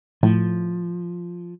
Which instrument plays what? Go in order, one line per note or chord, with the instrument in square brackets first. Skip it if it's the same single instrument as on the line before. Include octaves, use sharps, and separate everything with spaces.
[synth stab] A2 [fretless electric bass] F3